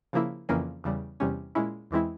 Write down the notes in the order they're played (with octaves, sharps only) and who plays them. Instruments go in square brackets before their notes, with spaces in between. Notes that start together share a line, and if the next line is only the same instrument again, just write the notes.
[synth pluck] C#3 F3 A#3 E4
F2 C#3 E3 A#3 C#4
E2 C#3 G3
E2 C3 G3 C#4
A#2 G#3 C#4 E4
E2 E3 G#3 C4 E4